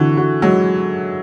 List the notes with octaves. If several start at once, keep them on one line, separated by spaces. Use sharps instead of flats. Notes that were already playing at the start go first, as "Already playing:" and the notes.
Already playing: D3 E3 F#4
F#4
F#3 G#3